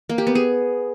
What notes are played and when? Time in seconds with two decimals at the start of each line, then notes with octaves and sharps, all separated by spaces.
0.09 A#3
0.18 G4
0.27 B3
0.35 G#4